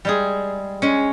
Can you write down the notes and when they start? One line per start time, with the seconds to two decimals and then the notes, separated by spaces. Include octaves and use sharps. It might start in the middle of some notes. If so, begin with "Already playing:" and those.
0.05 G3 G#3 G#4
0.82 G#3 C#4